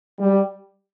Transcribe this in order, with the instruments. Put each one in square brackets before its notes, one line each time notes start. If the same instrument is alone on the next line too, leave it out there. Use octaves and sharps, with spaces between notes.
[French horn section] G3